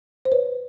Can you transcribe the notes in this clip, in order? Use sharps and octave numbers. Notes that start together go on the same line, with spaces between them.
C5
B4 C#5